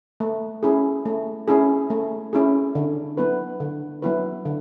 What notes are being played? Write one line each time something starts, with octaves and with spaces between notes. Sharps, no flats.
A3
C#4 E4 G#4
A3
C#4 E4 G#4
A3
C#4 E4 G#4
D3
F#3 B3 E4 B4
D3
F#3 B3 E4 B4
D3